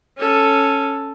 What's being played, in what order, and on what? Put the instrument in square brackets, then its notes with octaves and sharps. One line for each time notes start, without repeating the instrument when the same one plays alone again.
[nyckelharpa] C#4 A4